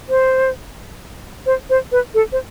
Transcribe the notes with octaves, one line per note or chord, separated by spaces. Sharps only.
C5
C5
C5
B4
A4
C5